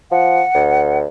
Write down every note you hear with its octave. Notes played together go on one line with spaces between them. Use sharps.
F3 F#5
D2